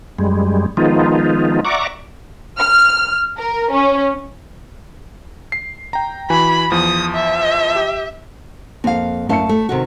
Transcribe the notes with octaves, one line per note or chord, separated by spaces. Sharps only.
F#2 G3 G#3
D#3 F3 G#3 B3 D#4 F4
D5 E5 F#5 A#5 C#6 D6
F6
A#4
C#4
C7
G5 A#5
E3 F#4 G#5 B5
E2 F3 D#6
E5
G4
F2 A#3 F5
F#1 A3 E5 F5 A5 C#7
A3 A4
C3 D#3 F#4